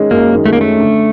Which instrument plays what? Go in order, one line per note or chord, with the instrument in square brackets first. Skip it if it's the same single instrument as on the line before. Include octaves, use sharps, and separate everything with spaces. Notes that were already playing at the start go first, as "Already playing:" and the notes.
Already playing: [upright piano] D#3 G#3 C#4
[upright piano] F#2 [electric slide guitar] A#3
[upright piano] D#3
[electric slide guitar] A3
A#3
[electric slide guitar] A3 [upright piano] C#4
[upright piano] D3